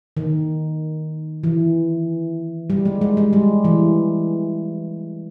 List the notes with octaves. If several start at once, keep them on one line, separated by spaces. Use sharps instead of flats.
D#3
E3
G3
G#3
G#3
G#3
G3
E3